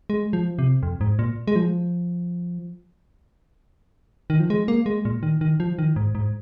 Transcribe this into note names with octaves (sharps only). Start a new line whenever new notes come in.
G#3
F3
C3
F2
G#2
A#2
G#3
F3
D#3
F3
G#3
A#3
G#3
A#2
D#3
D#3
F3
D#3
G#2
G#2